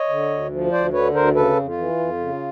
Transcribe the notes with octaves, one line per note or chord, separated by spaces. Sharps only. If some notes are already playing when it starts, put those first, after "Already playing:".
Already playing: C#5 D#5
D3
D2
F3
D2 C5 D5
D3 B4 C#5
D2 A#4 C5
C#3 A4 B4
F2
F4
E3
F2
C#3